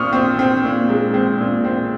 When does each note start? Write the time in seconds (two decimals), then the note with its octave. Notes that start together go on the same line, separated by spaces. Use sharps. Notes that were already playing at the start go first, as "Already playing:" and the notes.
Already playing: A#2 C4 C#6 D#6 F6
0.12 C4
0.39 C4
0.64 A#2
0.89 G#3
1.14 C4
1.40 A#2
1.65 C4